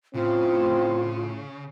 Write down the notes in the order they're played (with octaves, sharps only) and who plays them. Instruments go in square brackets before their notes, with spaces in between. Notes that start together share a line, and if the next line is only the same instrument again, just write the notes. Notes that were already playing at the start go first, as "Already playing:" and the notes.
[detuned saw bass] A2 [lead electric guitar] C#3 [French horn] C4 [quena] F4